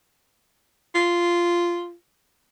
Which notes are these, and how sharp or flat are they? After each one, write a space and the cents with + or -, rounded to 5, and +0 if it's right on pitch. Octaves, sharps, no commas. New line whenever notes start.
F4 -10